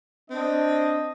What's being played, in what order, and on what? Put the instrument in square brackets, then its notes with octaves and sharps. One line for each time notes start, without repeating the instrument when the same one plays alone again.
[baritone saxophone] C4 [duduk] D4 [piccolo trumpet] D#5